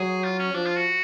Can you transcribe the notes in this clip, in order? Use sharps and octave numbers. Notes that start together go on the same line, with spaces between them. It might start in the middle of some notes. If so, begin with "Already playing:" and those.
Already playing: F#3 G#4
F4
C#4
F3 D4
F4
F#4